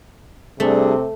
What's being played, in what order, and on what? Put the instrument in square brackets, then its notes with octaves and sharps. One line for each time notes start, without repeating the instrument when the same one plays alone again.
[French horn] C3 [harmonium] G3 D4 G#4 [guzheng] A3